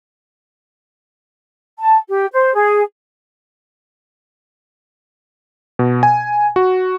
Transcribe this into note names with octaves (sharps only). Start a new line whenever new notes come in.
A5
G4
C5
G#4
B2
G#5
F#4